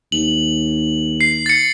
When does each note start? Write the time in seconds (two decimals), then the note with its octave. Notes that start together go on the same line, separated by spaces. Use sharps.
0.12 D#2 F#7
1.21 C7
1.46 A6 C#7